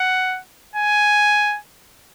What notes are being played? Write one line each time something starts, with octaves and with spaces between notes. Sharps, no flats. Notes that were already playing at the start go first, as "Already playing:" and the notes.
Already playing: F#5
G#5